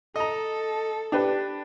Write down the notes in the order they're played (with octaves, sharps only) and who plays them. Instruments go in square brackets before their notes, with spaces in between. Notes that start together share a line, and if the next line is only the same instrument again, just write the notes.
[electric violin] A4 [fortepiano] D#5 A#5
[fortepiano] D4 G4 B4